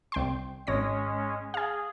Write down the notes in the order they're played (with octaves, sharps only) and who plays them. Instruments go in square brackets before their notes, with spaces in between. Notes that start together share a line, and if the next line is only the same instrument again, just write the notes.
[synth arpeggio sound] C2 G5 C6
[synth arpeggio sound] G#1 C#5 A#6 [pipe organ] G#3 C#4
[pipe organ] G#4 [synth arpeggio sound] F5 G#5